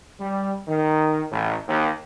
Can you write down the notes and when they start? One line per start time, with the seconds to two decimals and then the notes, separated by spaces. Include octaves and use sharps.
0.19 G3
0.67 D#3
1.31 A1
1.68 D#2